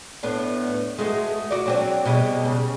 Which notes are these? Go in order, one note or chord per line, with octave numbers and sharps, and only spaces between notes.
A2 B3 D4
G#3 A3 F#4
F#4 D5
F#3 C4 D4
B2 G3 G#3
C#3